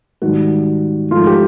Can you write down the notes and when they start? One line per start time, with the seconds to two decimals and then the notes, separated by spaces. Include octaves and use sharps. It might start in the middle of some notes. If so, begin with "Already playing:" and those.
0.22 G#2 D#3 G3 F#4
1.11 G#2 F3 A3 F4
1.27 G4